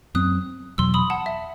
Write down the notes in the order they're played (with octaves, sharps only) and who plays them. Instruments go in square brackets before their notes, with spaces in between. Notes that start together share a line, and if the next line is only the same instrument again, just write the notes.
[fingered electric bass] F#2 F#3 C4 [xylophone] D#6 F#6
[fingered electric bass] E2 B2 F#3 [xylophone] C6 E6
[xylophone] B5 D#6
F#5 A5
E5